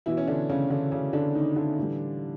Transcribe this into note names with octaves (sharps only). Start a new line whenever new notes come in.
B2 E3 F#3 E4
C#4
D3 D4
C#3 C#4
D3 D4
C#3 C#4
D3 D4
D#3 D#4
D3 D4
A2 E3 G3